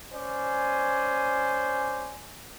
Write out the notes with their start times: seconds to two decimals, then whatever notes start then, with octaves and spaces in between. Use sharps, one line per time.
0.11 C#4 C5 D5 G#5